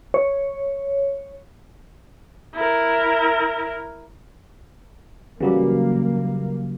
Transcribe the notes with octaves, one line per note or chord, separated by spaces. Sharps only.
C#5
E4 A#4
C#3 E3 F#3 G3 A#3 G4